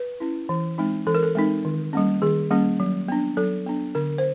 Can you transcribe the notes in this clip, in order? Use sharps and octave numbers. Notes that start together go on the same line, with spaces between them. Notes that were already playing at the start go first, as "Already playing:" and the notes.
Already playing: B4
C#4 E4
E3
G#3 C4 D#4
E3 A4
A#4
A4
G#3 C4 D#4
D#3
G3 A#3 C#4
D#3 G#4
G3 A#3 C#4
F#3
B3 D4
F#3 A4
B3 D4
D3 A#4
C5